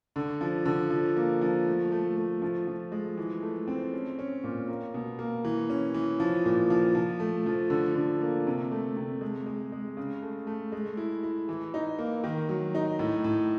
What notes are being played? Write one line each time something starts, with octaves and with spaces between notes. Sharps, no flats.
D3
F3
D3
F3
A#3
F3
A3
A3
A3
F3
F3
G#3
E3
A3
C4
C#4
C#4
A#2
A#3
B2
A#3
E3
C#4
E3
F3
A#2
F3
F3
A3
F3
D3
D3
A#3
C3
A3
C3
G#3
G#3
G#3
C#3
A3
A3
G#3
E4
E4
E3
D#4
A#3
D#3
F#3
D#4
A2
A2